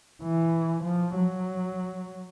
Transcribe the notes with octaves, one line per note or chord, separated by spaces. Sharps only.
E3
F3
F#3